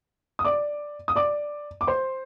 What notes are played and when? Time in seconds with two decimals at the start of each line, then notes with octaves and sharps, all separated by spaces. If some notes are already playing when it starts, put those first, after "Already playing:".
0.39 D#6
0.45 D5 D6
1.08 D#6
1.16 D5 D6
1.81 D6
1.87 C5 C6